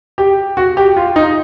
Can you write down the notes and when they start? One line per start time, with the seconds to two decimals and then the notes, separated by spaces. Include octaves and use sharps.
0.18 G4
0.57 F#4
0.77 G4
0.96 F4
1.16 D#4